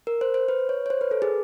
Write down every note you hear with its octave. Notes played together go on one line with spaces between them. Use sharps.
A#4
C5
C5
B4
C#5
C#5
C5
B4
A4
G#4